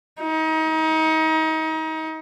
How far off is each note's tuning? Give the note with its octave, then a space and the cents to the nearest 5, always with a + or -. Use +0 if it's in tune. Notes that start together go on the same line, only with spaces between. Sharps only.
D#4 +30